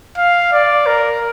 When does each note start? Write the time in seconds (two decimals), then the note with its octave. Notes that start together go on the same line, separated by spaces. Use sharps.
0.18 F5
0.53 D5
0.86 A#4